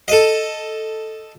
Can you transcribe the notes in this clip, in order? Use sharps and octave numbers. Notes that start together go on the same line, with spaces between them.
A4 D#5